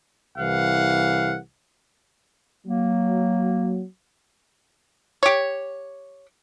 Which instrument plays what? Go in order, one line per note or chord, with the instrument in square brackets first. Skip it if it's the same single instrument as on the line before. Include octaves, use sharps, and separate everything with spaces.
[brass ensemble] C2 E3 F5 F#5
[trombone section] F#3 [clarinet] A#3
[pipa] G4 C#5